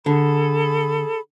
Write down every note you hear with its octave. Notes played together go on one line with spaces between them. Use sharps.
D3 G#4 A4 B5